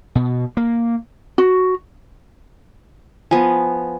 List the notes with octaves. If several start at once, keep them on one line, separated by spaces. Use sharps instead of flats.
B2
A#3
F#4
F3 B3 G#5